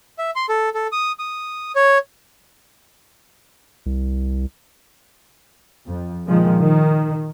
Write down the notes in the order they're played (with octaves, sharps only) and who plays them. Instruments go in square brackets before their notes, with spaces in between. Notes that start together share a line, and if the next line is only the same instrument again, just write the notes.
[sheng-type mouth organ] E5
C6
A4
A4
D#6
D#6
C#5
[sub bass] C2
[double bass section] F2
A#2 D#3 F3 G#3
D#3